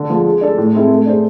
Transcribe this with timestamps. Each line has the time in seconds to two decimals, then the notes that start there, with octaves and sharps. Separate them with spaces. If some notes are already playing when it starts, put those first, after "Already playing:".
Already playing: D3
0.10 F3 G#3
0.26 G#3
0.41 D4 A4
0.58 A2
0.73 G#3 C4 E4 A4
0.90 A3
1.06 D4 G#4 C5